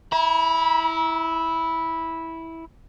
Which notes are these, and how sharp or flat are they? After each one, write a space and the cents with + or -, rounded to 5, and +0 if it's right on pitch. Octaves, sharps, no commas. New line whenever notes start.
E4 -10 A#5 +45